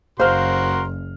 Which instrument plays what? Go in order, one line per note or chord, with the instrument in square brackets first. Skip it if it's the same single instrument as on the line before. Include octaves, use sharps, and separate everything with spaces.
[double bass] F#1 [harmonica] F#4 A#4 C6 [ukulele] C5 [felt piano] F5 F6